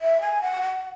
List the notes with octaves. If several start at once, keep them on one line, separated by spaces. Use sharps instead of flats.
E5
G#5
F#5
F#5